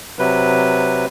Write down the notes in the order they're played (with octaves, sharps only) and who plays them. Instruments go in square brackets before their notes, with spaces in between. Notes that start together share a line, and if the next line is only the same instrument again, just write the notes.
[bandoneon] C3 F#3 B4